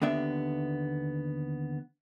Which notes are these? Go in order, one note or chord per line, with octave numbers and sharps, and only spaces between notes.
D#2 D3 B3 D4 E5